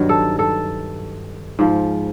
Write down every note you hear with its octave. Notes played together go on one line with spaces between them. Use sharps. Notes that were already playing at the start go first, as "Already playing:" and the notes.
Already playing: G2 D#3 F#3
A4
A4
G#2 F3